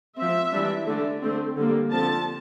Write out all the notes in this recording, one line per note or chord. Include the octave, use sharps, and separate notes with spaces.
F3 C4 E5
E3 G3 D4
D3 A3 D4
D3 A3 C4
D3 G3 A#3
D3 F3 C4 A5